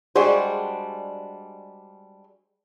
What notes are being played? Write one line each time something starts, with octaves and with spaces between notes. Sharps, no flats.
G3 G#3 D4 F#4 G#4 C5